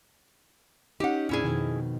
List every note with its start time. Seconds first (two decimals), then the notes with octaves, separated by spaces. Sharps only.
1.00 C#4 D#4 G4 F#5
1.29 F2 A#2 C#4 D4 E4 G#4
1.44 F2 B2 D#3